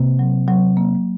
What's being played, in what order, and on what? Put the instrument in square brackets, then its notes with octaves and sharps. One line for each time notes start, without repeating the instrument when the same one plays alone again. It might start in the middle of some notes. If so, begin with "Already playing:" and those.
Already playing: [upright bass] C3 [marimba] A#3
[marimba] F#3
F#3
A#3